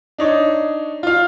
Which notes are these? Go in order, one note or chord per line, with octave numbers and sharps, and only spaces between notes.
D4 D#4 C#5
F4 F5